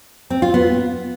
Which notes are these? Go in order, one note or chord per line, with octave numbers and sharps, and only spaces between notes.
C4
F4
B3